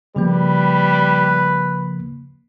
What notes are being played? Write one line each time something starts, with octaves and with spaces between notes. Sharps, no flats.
C#3 F3 G3 A#3 B4